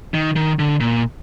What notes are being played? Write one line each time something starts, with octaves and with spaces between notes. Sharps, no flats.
D#3
D#3
D3
A#2